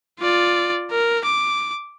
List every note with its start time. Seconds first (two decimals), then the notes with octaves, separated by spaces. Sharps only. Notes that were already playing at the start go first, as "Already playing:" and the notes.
0.20 F4 D5
0.91 A#4
1.25 D6